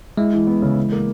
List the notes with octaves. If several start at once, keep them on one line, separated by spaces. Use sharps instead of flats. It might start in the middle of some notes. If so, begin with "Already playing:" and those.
G#3 E4
E3
B3
C#3
E3
A#3